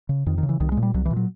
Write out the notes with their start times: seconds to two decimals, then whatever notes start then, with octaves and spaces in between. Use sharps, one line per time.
0.09 C#3
0.26 F2 D#3
0.38 D#3
0.43 C#3
0.49 E3
0.60 C2 D#3
0.72 G#3
0.77 A#2
0.83 G3
0.94 C2 F#3
1.05 E3
1.11 A#2
1.16 F#3